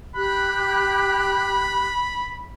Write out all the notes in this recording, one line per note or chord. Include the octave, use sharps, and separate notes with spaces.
G4 B5 F#6